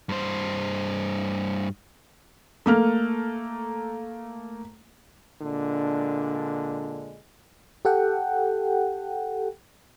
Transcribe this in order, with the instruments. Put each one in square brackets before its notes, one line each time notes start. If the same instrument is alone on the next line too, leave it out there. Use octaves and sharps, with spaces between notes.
[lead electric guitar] G2 C5
[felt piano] A3 A#3 F6
[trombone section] A#2 D3 G#3 D4
[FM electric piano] G4 A4 F#5 G5